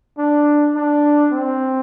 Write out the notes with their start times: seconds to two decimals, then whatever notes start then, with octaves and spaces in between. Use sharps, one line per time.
0.18 D4
0.75 D4
1.32 C4